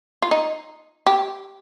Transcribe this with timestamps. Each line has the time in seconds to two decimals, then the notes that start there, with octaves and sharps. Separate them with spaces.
0.22 F4
0.31 D#4
1.07 G4